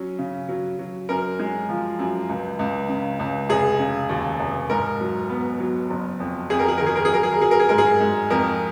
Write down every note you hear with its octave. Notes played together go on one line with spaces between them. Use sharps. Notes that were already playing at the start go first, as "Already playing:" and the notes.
Already playing: F#3 C#4
C#3
F#3
F#3
F#2 A#4
G#3
F3
F#2
C#2
C#2
C#3
C#2
F1 G#4
C#3
D#2
F1
G#2 A#4
F#3
B3
F#3
F#1
F2
F2 G#4
A#4
G#4
D#3 A#4
G#4
A#4
G#4
F#3 A#4
G#4
A#4
F#3 G#4
A#4
G#4
G#2 A#4
G#4
G#2
F2 A#4